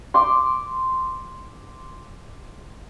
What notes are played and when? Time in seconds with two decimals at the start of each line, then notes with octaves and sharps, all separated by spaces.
0.14 C6 D6